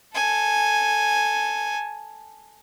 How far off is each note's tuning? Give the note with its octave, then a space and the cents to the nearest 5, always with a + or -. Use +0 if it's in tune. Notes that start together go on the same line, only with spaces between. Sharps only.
A4 +0 G#5 +0